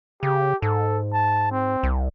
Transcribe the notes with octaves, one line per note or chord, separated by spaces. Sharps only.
C#3 G4
G#2 A4
A5
C4
C2